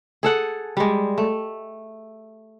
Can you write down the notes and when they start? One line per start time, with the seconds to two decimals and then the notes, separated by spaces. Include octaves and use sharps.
0.23 G#4 A4 F#5
0.77 G3 G#3
1.18 A3